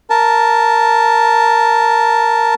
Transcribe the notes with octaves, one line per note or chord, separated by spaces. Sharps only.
A#4 A5